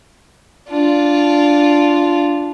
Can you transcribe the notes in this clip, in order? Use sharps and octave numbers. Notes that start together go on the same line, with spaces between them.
D4 F4